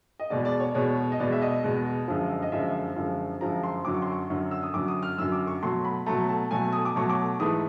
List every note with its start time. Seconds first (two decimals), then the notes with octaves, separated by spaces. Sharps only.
0.20 D#5
0.30 E2 B2 G#3 D5
0.45 D5
0.60 C#5
0.75 E2 B2 G#3 C#5
1.12 D#5
1.19 E2 B2 G#3 D5
1.32 E5
1.41 D#5
1.63 E2 B2 G#3
2.08 F#2 D3 F3 G#3
2.42 D#5
2.52 F#2 D3 F3 G#3 E5
2.96 F#2 D3 F3 G#3
3.40 F#2 D3 F3 G#3 A#5
3.63 C6
3.85 F#2 D3 F#3 D6
3.94 C#6
4.02 C6
4.12 C#6
4.30 F#2 D3 F#3
4.51 E6
4.63 D#6
4.74 F#2 D3 F#3 D6
4.88 D#6
5.03 F6
5.18 F#2 D3 F#3 E6
5.32 D6
5.47 C#6
5.62 B2 F#3 A3 C6
5.85 B5
6.06 B2 F#3 A3 A#5
6.29 A5
6.51 B2 F#3 A3 G#5
6.73 D#6
6.85 D6
6.95 B2 F#3 A3 C#6
7.09 D6
7.39 G#2 E3 A3 D#6